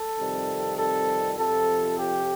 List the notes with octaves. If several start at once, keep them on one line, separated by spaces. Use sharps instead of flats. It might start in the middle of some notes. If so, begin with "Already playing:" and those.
Already playing: A4
F2 C3 D#3 G3
A4
F2 C3 F3 A4
G4